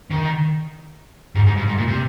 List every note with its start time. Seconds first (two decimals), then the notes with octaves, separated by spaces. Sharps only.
0.11 D#3
1.36 G#2
1.47 G#2
1.58 G2
1.68 G#2
1.78 A#2
1.88 C3